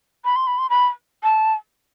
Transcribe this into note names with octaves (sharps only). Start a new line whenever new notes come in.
B5
C6
B5
C6
B5
A5